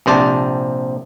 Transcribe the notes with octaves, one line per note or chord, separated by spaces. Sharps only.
A#1 C3 C5 D5 A5